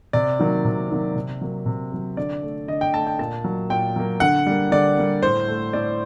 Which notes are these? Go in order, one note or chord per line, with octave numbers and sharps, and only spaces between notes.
C3 D5
D#3 F#3 A#3
C3
D#3 F#3 A#3
C3
F#3 A#3
C3
F#3 A#3
D3 D5
A3
D3 D#5
G5
A3 A5
G5
A#2 A5
F#3 A#3
A#2 G5
F#3 A#3
D3 F#5
G3 A#3
D3 D5
G3 A#3
A2 C5
A3
A2 D5